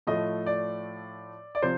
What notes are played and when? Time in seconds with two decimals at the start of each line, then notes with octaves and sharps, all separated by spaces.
0.07 A2 F3 A3 D#5
0.46 D5
1.55 D5
1.62 C3 F3 C5